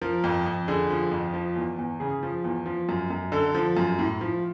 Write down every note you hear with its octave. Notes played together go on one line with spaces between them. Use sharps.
F3 A#4
F2
F2
D3 G#4
F3
F2
F3
E2
E2
C#3 G#4
F3
E2
F3
F#2
F#2
D3 A4
F3
F#2
A2
F3